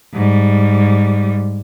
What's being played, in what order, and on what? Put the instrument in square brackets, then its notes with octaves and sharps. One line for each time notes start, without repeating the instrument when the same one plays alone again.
[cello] G#2 G3